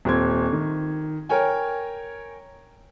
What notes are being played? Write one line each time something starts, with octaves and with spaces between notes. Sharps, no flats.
D#1 C4 G#6
D#3
A#4 C#5 G5 G#5